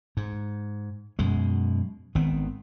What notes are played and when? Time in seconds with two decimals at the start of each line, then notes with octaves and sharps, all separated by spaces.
0.17 G#2
1.19 F#2 B2 G#3
2.15 G#1 D#3 B3 C4